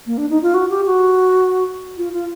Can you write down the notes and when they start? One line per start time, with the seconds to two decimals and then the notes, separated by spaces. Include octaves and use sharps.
0.06 A#3
0.18 D4
0.30 D#4
0.43 F4
0.54 F#4
0.70 G4
0.86 F#4
1.98 F4
2.13 F4